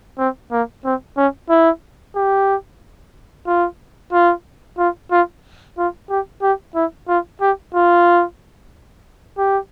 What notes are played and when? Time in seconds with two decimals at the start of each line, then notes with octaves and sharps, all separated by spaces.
0.18 C4
0.52 A#3
0.84 C4
1.17 C#4
1.49 E4
2.15 G4
3.46 F4
4.13 F4
4.78 F4
5.11 F4
5.77 F4
6.09 G4
6.42 G4
6.75 E4
7.08 F4
7.41 G4
7.74 F4
9.38 G4